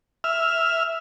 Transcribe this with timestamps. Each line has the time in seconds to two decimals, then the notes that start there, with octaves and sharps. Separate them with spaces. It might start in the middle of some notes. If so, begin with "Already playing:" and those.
0.24 E5 F6